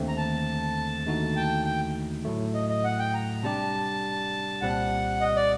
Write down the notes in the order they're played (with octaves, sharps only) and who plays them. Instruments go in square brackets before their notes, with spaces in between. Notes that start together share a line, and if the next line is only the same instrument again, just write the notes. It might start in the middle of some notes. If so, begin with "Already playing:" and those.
Already playing: [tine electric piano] D#2 D3 A3 C4
[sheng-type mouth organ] A#5
A5
[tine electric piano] D#2 D3 A3 D#4 F#4
[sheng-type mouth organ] G5
G5
[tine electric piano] A2 F#3 A3
[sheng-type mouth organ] D#5
D#5
F#5
G5
A#5
[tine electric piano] C3 G3 D4 G4 [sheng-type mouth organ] A5
[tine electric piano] C2 A#2 G3 C4 [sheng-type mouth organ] F#5
[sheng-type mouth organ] D#5
D5